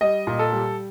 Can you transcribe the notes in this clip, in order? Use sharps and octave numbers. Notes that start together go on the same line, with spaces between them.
G3 D#5
A#2
A4
G3